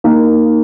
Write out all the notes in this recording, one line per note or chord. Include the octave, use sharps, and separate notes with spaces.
A#3 D#4 A#4